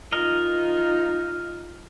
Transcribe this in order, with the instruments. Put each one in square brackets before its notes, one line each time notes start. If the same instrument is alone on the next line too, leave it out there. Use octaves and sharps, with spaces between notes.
[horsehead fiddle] D#4 F4 [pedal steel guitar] A#4 D#5